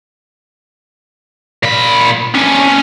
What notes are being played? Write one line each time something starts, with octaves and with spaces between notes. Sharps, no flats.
A#2 B5
C#4 D4